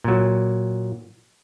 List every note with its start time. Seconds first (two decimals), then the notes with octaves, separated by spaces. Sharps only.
0.04 A#2 F#3